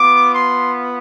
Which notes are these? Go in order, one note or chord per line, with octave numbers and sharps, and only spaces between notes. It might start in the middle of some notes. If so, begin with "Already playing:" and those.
Already playing: B3 F4 D6
C6